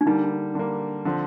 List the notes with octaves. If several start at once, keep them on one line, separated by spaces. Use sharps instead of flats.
D4
D3 G3 A#3 D#4
D3 G3 A#3
D3 F3 C4